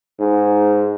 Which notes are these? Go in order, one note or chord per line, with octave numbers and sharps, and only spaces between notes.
G#2